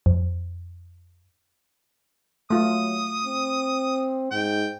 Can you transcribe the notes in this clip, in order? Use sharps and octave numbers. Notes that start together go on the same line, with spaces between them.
F2
F#3 A3 F4 D#6
C4
G#2 G5